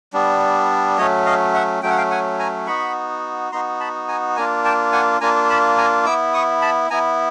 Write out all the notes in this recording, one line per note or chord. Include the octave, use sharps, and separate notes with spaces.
G3 B3 D4
F#3 A3 C#4 C#5 D#5
D#5 F5
E5 F#5
F#3 A3 C#4 G5
F#5
F5 G5
F#5 G#5
G#5 A#5
B3 D#4 F#4 B5 C#6
B3 D#4 F#4 A#5 C6
A5 B5
G#5 A#5
A#3 D4 F4 G#5 A#5
G5 A5
F#5 G#5
A#3 D4 F4 G#5 A#5
A5 B5
G#5 A#5
B3 E4 D6 E6
C#6 D#6
A5 B5
B3 E4 G#5 A#5